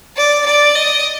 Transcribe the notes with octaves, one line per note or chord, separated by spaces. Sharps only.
D5
D5
D#5